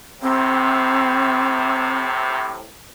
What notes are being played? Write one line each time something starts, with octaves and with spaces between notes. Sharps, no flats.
A2 C3 C4